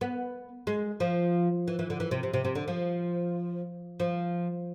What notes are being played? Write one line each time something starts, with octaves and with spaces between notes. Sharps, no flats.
B3
G#3
F3
E3
E3
D3
E3
C3
C3
C3
C3
D3
F3
F3